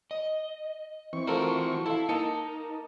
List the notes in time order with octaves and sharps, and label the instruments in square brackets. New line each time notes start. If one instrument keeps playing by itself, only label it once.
[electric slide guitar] D#5
[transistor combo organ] E3 C4 C#6
[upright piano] F4 A4 A#4 [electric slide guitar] F#4 C5
[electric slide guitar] E4 [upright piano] A4 F5
[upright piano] A#3 A5 C#7 [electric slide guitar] D#4 [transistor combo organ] A#4